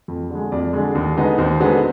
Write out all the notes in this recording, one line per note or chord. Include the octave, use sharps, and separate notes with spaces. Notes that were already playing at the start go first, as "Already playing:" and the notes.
F2
D3 G#3
F2 D5
D3 G#3
D#2
D3 G#3 B3 D#4
D#2 C5
D3 G#3 B3 D#4